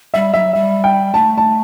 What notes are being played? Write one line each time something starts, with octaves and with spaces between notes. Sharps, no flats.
G3 E5
F#3 E5
G3 E5
G5
A3 A5
A5